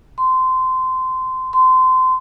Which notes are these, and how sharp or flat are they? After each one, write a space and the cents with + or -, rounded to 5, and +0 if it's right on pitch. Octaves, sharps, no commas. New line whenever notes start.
C6 -20
C6 -25